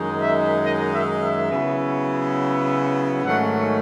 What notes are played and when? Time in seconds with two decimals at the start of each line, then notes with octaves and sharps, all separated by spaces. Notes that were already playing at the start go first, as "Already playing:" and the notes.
Already playing: F#2 D#3 G#3 D#4
0.20 E5
0.64 D#5
0.93 E5
1.22 E5
1.51 C#3 F#3 B3 E4
3.24 G#2 D#3 F#3 A3 C#4 F#5